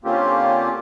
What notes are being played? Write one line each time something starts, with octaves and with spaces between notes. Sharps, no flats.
D3 A#3 C4 C#4 F4 G4